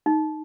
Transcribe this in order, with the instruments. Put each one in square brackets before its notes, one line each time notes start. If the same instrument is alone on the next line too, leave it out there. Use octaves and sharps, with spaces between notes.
[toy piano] D#4